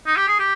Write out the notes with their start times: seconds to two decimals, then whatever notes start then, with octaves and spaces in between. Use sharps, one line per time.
0.06 D#4
0.16 G4
0.28 G#4
0.39 G4